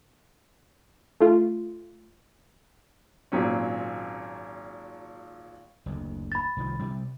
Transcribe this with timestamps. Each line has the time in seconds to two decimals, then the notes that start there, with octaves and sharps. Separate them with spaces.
1.20 A3 F4
3.32 G#1 A#2 F#3 C4 C#4
5.86 F#1 D2
6.32 B5 A6
6.57 C2 D#3 F3
6.79 C3 G3 C4